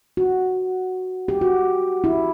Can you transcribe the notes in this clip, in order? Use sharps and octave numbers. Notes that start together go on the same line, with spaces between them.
F#4
G4
F#4
E4